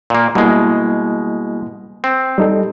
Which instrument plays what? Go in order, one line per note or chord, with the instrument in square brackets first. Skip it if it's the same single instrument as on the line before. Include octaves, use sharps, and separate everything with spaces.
[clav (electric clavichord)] A#2 A#3
[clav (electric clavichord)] B2 G#3 [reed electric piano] G3 A#3 E4
[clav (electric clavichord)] C4
[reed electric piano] G3 D#4 A4